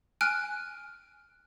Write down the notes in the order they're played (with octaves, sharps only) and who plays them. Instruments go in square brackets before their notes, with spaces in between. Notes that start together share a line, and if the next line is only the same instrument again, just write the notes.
[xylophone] G#5 F6 F#6 D7